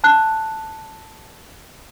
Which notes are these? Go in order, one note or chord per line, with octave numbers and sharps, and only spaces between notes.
A5 F#6